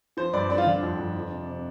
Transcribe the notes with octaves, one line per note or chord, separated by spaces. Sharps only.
F3 C5
G2 D5
G2 D4
F4
D3 D4
F2
F2
F3
C3
C3